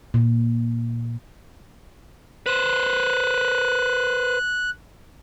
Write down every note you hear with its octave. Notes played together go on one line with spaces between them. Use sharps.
A#2
B4 C5 F#6